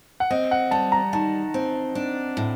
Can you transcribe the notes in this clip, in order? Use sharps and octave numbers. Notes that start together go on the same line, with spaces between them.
F#5
C4 D#5
F#5
G3 A5
A#5
D#3 A5
C4
D4
A2